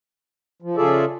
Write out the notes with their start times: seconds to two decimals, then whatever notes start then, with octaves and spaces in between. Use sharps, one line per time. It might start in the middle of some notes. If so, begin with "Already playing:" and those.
0.62 F3
0.77 C#3 F4 G#4 A4 D5 E5